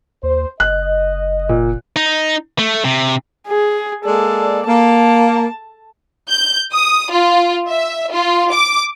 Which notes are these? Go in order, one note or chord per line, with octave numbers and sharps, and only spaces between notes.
D#2 C5
F#1 D#5 F#6
A#2
D#4
A3
C3
G#4
G#3 A#3 A4 D5
A#3 A5
G6
D#6
F4
E5
F4
D6